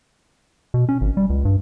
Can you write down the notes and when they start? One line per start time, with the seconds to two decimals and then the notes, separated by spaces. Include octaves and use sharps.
0.74 B2
0.89 C#4
1.01 G#1
1.17 G3
1.30 C#2
1.45 G2